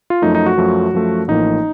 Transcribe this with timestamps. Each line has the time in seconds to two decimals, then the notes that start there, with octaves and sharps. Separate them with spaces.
0.10 F4
0.22 F#2 F3 A3 D#4
0.35 D#4
0.46 F#4
0.58 F#2 F3 A3
0.93 F#2 F3 A3
1.28 A1 A2 F3 A#3 D#4